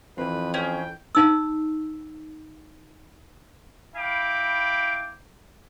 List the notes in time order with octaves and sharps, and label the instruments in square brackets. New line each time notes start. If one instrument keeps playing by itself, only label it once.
[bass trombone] F2 [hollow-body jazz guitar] E3 C4 [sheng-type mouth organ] B4
[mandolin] C#4 G#4 [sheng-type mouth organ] G5
[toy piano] D#4 E6
[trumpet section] E4 F5 G5 B5 D6